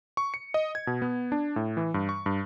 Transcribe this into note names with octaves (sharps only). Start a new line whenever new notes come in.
C#6
C#7
D#5
G#6
B2
B3
D4
A2
E3
G2
C#6
G2